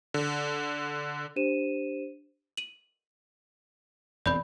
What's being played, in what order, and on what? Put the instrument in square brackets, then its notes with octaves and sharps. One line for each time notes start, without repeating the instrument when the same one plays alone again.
[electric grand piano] D3
[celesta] D4 G4 C5 D#7 E7
[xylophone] D#7 F#7
[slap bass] E1 E2 C4 [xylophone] D5 B5 G6